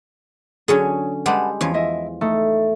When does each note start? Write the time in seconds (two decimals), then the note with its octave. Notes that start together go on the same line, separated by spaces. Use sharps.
0.68 D3 F#3 C#4 G#4 C#5
1.26 G3 G#3 G4 B4 F#5 A5
1.61 E2 F3 C#4
1.74 E4 D#5 E5
2.21 A3 D#4